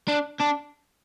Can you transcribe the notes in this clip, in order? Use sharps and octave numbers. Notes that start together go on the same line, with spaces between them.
D4
D4